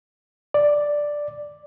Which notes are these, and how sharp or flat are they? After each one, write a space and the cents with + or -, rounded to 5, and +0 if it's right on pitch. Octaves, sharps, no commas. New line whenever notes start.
D5 +0